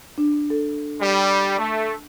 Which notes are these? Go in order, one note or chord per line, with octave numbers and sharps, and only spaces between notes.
D4
A4
G3
A3